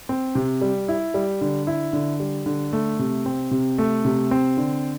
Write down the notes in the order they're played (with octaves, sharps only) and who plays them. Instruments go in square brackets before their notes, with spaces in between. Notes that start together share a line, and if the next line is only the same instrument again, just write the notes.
[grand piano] C4
C3
G3
E4
G3
D3
E4
D3
G3
D3
A3
C3
C4
C3
A3
C3
C4
D3